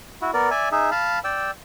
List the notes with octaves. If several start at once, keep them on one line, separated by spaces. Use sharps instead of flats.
E4 F#4
B3 A#4 D5
D5 E5 G#5
D#4 G#4 E5
F5 A5 B5
D5 G5 E6